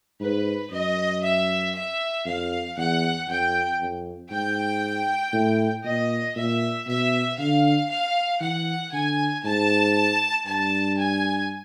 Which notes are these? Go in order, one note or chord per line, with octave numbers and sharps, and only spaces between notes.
G#2 B4
F#2 D#5
E5
E5
F2 F5
E2 F#5
F2 G5
F2
G#2 G5
A2
A#2 D#5
A#2 E5
B2 E5
D3 F5
F5
E3 F#5
D3 G#5
G#2 A5
G2 A5
G#5